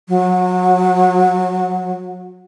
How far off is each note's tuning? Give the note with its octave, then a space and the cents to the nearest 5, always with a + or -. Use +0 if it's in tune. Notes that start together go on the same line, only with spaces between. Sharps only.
F#3 -30